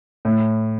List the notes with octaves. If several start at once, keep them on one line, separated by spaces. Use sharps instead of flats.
A2